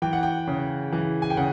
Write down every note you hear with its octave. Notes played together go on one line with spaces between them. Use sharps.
E3 G5
F#5
G5
C#3
E3
G#5
G5
C#3 F#5